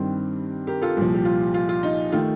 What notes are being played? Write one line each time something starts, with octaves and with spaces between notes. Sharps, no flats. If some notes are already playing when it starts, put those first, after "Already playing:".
Already playing: G2 D#3 G3 C4
G4 A#4
F4 A4
C2 A#2 F3
G4
F4
F4
F4
D#4
D#3 A3 F4